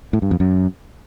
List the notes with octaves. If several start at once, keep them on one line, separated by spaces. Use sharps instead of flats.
A2
G2
F2
F#2